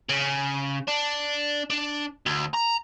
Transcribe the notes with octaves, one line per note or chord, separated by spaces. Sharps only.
C#3
D4
D4
D2
A#5